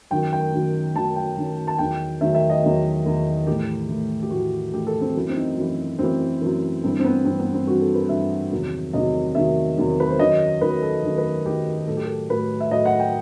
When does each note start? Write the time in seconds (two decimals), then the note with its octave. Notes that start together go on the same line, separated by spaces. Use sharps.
0.10 F#2 D#3 F#3 G5
0.33 G5
0.53 F#2 D#3 F#3
0.95 F#2 D#3 F#3 A5
1.16 G5
1.36 F#2 D#3 F#3
1.68 A5
1.78 E2 D#3 F#3 G5
2.21 E2 D#3 F#3 E5
2.35 E5
2.50 D#5
2.63 E2 D#3 F#3
3.05 E2 D#3 F#3
3.47 A2 E3 G4
3.89 A2 E3
4.23 G4
4.31 A2 E3 F#4
4.73 A2 E3 G4
4.87 A4
5.01 C4
5.16 F#2 E3
5.29 C4
5.36 D#4
5.57 F#2 E3
5.99 F#2 E3 C4
6.41 F#2 E3
6.84 G2 C4
6.87 E3
7.00 C4
7.04 B3
7.25 G2 C4
7.29 E3
7.39 B3
7.54 C4
7.67 G2 F#4
7.70 E3
7.81 A4
7.95 B4
8.09 G2 E3 E5
8.52 E2 C3 D#3 F#3
8.93 E2 C3 D#3 F#3 D#5
9.35 E2 C3 D#3 F#3 E5
9.77 E2 C3 D#3 F#3
10.00 B4
10.10 C5
10.19 F#2 D#3 F#3 D#5
10.61 F#2 D#3 F#3 B4
10.83 A4
11.03 F#2 D#3 F#3
11.18 B4
11.45 F#2 D#3 F#3 G4
11.87 A2 F#3 A4
11.97 G4
12.06 A4
12.29 A2 F#3 B4
12.60 E5
12.71 A2 F#3 D#5
12.85 F#5
13.00 G5